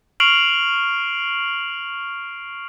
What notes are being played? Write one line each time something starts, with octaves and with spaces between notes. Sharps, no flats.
C#6 F6 C7 D7 F7 F#7